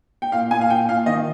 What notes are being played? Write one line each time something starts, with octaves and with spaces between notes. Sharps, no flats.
G5
A#2 F5
A#2 G#5
F5
A#2 G5
A#2 F5
D#3 D#5